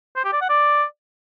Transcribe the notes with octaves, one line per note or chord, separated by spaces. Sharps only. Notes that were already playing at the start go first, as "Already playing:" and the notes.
C5
G4
D5
F#5
D5